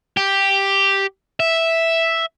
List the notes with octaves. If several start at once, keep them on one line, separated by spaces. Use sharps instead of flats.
G4
E5